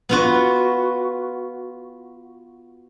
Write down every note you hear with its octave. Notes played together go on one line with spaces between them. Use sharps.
B3 F4 F#4